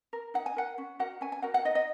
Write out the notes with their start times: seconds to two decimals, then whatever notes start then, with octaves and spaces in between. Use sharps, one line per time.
0.13 A#4
0.34 D#4 F#5
0.46 G#5
0.56 A#4 F#5
0.78 C#4
0.99 F#4 A#4 F#5
1.21 C#4 G#5
1.32 G#5
1.42 F#4 A#4 F#5
1.54 F#5
1.65 D#4 D#5
1.75 D#5